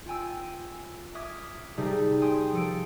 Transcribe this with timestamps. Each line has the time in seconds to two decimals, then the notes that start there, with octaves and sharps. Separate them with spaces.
0.06 F4 G5 G#5 E6
1.15 E5 D6 D#6 F6 G#6
1.77 C3 G3 D#4 G#4 A4
2.21 G5 G#5 C6 D#6
2.52 F3 A4 D7